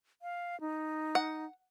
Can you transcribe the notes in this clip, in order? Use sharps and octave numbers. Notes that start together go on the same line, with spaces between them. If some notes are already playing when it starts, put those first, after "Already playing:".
F5
D#4
F#5